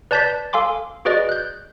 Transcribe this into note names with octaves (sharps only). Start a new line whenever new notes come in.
B4 D5 A5 G6 A6 B6
A4 F5 G#5 C6 D6
F#4 G#4 B4 D5 D#5
F#6 G6